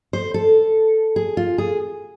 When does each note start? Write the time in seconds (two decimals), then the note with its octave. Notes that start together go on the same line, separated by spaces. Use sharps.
0.13 C5
0.34 A4
1.16 G#4
1.37 F4
1.58 G#4